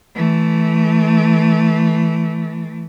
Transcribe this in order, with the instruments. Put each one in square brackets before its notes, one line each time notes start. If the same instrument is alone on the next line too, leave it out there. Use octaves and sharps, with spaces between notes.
[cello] E3 A3